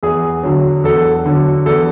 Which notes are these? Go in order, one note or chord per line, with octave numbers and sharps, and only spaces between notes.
E2 G#4
D3 F#3
E2 A4
D3 F#3
E2 A4